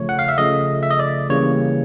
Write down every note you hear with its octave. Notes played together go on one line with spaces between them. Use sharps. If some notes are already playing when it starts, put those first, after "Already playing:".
Already playing: C#3 F3 A3 C#5
F#5
F5
E5
C#3 F3 A3 D#5
E5
D#5
D5
C#3 E3 G3 A#3 C#5